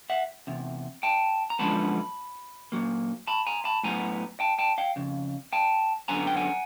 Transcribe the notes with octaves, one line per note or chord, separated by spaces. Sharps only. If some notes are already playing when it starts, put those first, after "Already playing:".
E5 F#5
E2 C3
G5 A5
A#5
F#2 D3 F3 G#3 B3 A5 B5
A#2 F#3 A#3
A5 B5
G#5 A#5
A5 B5
A2 F#3 B3 G#5 A#5
G5 A5
G5 A5
F5 G5
F2 C#3
G5 A5
F#2 D3 F#3 B3 G#5 A#5
G5
F#5 G#5